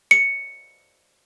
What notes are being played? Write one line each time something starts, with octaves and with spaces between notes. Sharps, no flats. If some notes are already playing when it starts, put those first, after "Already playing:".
C#7